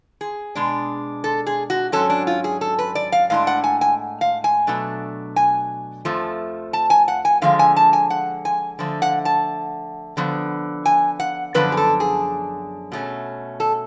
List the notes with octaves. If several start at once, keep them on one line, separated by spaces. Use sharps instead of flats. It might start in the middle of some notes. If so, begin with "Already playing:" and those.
G#4
B2 G#3 D4
A4
G#4
F#4
G#2 F#3 C#4 A4
D4
F4
G#4
A4
B4
D5
F5
A2 G#3 D4 F5
F#5
G#5
G#5
F5
G#5
B2 F#3 A3 D4
G#5
F2 F3 A3
A5
G#5
F#5
G#5
D3 F3 G#3 F5
G#5
A5
G#5
F#5
G#5
D3 F3 A3
F#5
A5
D3 F3 B3
G#5
F#5
F#2 D3 F3 B3 D4 B4
G#4
A4
G#4
B2 A3 C#4
A4